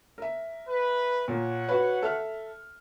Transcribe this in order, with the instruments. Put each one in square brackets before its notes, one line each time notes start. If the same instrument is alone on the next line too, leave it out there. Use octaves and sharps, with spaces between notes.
[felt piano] A#4 E5
[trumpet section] B4
[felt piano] A#2 A#3 [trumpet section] C#5 F#5
[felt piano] F#4 B4
A4 E5 F6